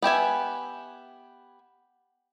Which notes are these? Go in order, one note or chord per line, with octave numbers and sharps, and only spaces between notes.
B3 G4 E5 G#5